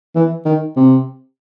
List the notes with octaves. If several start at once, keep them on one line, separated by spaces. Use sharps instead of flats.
E3
D#3
C3